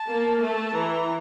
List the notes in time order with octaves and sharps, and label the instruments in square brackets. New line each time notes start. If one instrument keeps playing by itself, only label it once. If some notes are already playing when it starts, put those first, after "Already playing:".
Already playing: [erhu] A5
[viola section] A#3
[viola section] A3 [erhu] A5
[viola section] E3 [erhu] A#5